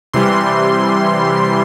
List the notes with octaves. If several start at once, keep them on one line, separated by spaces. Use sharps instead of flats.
C3 E3 G3 C6